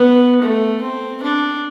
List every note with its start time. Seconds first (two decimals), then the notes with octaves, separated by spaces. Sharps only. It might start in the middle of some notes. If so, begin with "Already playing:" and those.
Already playing: B3
0.42 A3
0.82 C4
1.23 D4